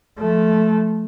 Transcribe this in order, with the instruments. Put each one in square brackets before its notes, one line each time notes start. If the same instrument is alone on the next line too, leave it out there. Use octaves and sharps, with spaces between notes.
[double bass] F3 A3